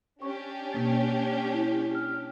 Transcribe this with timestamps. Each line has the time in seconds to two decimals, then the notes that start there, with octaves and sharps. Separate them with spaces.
0.22 C#4 D4 G4 C#6
0.73 B2 A#3 A6
1.54 E4
1.95 F6